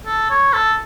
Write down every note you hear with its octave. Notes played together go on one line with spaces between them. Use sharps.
A4
C#5
A4